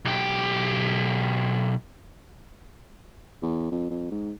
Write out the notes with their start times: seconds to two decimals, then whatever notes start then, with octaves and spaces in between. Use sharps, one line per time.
0.05 B1 G4
3.42 E2
3.72 F2
3.91 F2
4.11 G#2